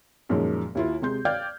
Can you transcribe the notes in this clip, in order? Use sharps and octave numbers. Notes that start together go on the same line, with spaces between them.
F#2 A#2 D#3 F3 G#3
D#2 E4 F4
C3 G#3 C6 G6
D5 F5 G5 F6 G6 G#6